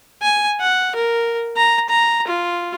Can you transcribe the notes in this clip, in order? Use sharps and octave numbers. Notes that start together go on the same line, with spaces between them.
G#5
F#5
A#4
A#5
A#5
F4